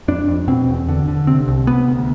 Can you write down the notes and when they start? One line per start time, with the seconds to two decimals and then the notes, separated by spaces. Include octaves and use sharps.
0.08 F2 D4
0.28 F2
0.48 B2 C4
0.68 E2
0.88 D3
1.08 D3
1.27 C3 C4
1.48 C2
1.67 C3 B3
1.88 D2